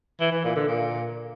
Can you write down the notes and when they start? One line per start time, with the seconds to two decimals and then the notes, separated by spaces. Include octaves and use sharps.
0.21 E3
0.33 E3
0.44 A#2
0.56 D3
0.68 A#2